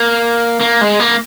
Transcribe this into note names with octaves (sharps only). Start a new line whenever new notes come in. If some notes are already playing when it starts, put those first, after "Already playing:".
Already playing: A#3
A#3
G#3
A#3